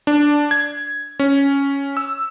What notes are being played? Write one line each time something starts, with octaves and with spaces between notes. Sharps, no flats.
D4
G#6
C#4
E6